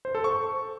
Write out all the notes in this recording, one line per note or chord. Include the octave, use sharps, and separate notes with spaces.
C5
A4
C#6